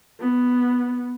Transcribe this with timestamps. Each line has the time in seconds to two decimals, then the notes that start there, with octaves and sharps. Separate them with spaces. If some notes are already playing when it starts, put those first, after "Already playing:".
0.20 B3